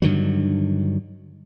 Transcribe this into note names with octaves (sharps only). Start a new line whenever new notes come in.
G2 D3 D#3 F#3